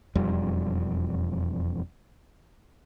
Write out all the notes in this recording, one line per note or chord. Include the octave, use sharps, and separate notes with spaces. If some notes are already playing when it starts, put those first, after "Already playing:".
E1 F2 G3